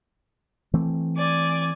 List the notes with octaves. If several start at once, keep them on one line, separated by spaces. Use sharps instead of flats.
E3 A3 C4
D5 G#5